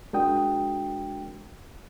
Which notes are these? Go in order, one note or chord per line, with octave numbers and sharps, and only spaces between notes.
G#3 D4 F#4 A#4 G5 D#6